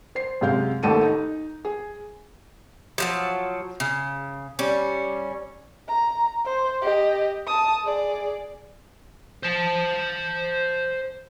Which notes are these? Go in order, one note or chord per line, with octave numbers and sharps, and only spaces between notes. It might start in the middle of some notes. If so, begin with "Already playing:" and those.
C5 C7
F#2 C3 G#3 F5 G6
A1 D#2 A4 D#7
D#4
G#4
F3 F#3 A5
C#3
G3 C#4
A#5
C5
G4 D#5
A5 D#6
G#4 D5
C5 A5